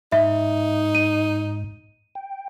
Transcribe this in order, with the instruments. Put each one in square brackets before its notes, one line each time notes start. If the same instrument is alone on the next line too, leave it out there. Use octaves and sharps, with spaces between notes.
[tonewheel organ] G#2 [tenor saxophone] D#4 [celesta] E5
[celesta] D#7
[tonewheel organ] G5